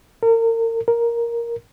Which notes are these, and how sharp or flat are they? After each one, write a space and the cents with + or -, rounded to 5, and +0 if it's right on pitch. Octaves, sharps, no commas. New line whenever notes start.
A#4 -35
A#4 +5